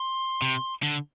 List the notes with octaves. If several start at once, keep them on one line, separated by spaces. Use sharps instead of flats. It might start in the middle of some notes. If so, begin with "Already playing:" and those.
Already playing: C6
C3
D3